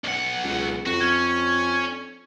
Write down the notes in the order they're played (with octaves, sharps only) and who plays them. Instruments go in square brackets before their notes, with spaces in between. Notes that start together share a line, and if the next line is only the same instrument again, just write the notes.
[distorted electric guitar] B1 F#5
[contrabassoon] C#2
[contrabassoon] F2 [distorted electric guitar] F#4
[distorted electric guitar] C#4 [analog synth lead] G#6